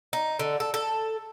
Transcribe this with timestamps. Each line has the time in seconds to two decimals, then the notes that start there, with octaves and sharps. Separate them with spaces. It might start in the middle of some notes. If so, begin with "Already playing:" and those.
0.13 D#4
0.39 D3
0.60 A4
0.74 A4